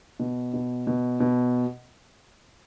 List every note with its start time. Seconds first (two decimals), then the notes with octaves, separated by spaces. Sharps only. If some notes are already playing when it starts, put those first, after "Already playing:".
0.20 B2
0.54 B2
0.87 B2
1.20 B2